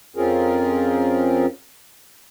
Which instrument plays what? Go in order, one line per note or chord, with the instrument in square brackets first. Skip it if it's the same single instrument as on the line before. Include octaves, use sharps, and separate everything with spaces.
[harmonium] F2 C4 C#4 F4 G#4 A#4